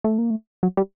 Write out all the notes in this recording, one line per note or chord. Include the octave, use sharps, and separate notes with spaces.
A3
A#3
A3
F#3
G3